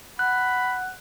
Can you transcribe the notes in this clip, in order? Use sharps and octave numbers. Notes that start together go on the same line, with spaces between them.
F#5 B5 F#6